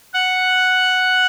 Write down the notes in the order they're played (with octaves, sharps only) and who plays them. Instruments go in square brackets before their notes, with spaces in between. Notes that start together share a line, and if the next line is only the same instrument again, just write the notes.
[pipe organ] F#5